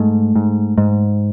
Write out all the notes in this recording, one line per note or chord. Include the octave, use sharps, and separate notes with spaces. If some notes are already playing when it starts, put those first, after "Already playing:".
Already playing: G#2 A3
G#2
G#2